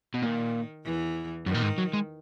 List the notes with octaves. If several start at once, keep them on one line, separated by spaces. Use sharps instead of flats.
B2
A#2 D#3
E2 E3
F#2 D#3
A#2
G#2
F#3
G#3